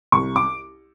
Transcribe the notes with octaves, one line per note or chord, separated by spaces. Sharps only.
C2 C#6
D6